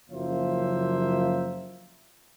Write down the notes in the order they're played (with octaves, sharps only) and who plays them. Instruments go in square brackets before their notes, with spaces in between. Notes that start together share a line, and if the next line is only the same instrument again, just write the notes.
[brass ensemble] F#1 F#2 F3 A#3 C5 E5